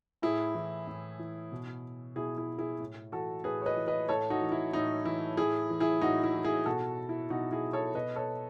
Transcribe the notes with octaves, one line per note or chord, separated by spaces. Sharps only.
A2 E4 G#4
E3
A2
E3
B2
B2 E4 G#4
E4
E4 G#4
A2
E3 F#4 A4
A2 G#4 B4
C#5
B4 D#5
E3
B4 D#5
A2 A4 C#5
D#4 F#4
E3
E4
A2 D#4
E3 E4
A2 E4 G#4
E3
E4 G#4
A2 D#4 F#4
E4
E3
E4 G#4
B2 F#4 A4
E4
B2 D#4 F#4
E4 G#4
A4 C#5
B2 B4 D#5
A4 C#5